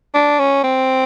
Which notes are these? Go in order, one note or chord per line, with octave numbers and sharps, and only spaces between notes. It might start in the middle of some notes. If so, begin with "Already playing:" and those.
D4
C#4
C4